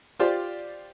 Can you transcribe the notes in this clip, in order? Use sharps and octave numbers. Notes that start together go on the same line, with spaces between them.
F4 G4 C5 D5